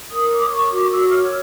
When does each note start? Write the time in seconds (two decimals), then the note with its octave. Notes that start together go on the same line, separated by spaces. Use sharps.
0.11 A#4 D#6
0.31 C#5 D6
0.51 A#4 C#6
0.71 F#4 D6
0.91 F#4 E6
1.11 C#5 F6